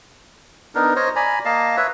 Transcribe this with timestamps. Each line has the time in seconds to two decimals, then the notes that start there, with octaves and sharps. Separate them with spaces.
0.75 B3 D4 D#4 A#4
0.96 C5 C#5 D#5
1.16 D5 G#5 A#5 B5
1.45 A#3 D#5 F5 A5
1.77 B4 C#5 E5